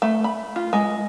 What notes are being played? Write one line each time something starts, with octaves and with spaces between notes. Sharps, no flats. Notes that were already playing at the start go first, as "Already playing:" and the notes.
A3
B5
F4
G#3